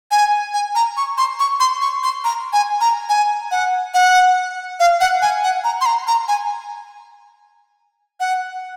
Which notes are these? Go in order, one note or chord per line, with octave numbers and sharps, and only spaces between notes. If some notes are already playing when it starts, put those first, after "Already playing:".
G#5
G#5
A#5
C#6
C6
C#6
C6
C#6
C6
A#5
G#5
A#5
G#5
F#5
F#5
F5
F#5
G#5
F#5
A#5
C6
A#5
A#5
G#5
F#5